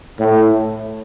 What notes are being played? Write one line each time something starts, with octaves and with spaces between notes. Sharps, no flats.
A2